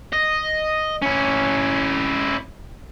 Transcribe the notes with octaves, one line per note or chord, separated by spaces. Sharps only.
D#5
C#4 E4